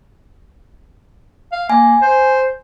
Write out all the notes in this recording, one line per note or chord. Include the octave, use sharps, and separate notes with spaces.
F5
A#3 G#5
C5